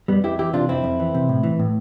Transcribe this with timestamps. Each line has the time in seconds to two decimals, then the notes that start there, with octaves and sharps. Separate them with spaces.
0.08 F2 G3 B3
0.24 F2 E4 G4
0.39 E3 E4 G4
0.53 C3 D4 F4
0.69 F2 C4 E4
0.84 F2
1.00 E3
1.14 C3
1.29 A2
1.43 E3
1.59 A2